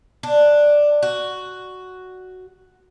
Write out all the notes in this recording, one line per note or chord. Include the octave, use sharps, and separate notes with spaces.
D4
F#4